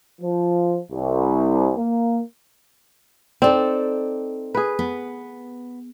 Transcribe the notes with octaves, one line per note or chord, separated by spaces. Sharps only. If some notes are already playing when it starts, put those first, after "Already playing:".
F3
C2
A#3
C4 D#4 A4 D5
G#4 B4
B3